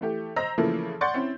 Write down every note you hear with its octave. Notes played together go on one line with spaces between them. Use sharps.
E3 A3 G4
C5 D#5 A#5 E6 A#6
C#3 E3 F3 A3 A#3
D5 F#5 C6 C#6 G6 A6
C4 C#4 E4